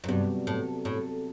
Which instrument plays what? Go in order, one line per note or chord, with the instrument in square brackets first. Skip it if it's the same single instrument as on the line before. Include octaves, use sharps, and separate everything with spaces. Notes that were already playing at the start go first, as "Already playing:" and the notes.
[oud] F#2
[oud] G2 [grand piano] C3 F#3 B3 F#4
[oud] A2
A2